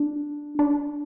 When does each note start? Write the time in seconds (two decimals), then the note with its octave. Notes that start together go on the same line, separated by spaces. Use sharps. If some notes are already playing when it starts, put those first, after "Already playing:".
Already playing: D4
0.59 D4